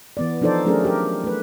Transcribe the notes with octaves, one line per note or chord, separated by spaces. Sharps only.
E3 B3 D5
F3 D4 D#4 A4 C5 D5
F#3 A3 C#4 D4 G#4 A#4
G4 A#4
A3 B4